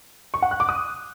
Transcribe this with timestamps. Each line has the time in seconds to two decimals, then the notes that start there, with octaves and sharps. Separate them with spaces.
0.34 C#6
0.42 F#5
0.51 F#6
0.60 D6
0.69 D#6